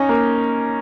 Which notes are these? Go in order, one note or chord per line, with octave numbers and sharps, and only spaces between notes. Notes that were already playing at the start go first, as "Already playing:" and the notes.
Already playing: C#4 D#4
A#3